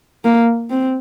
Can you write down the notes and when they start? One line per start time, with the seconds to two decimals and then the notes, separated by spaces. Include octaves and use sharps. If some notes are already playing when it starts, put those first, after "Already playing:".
0.25 A#3
0.70 C4